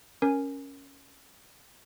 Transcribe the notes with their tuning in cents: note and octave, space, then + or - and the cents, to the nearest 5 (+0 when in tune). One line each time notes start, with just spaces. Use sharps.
C#4 +0 A#4 +5 G#5 +0